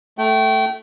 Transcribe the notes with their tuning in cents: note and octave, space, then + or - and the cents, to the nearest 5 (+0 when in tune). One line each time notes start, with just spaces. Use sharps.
A3 +0 G5 -30